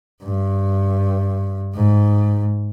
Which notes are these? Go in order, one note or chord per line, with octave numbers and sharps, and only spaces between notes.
G2
G#2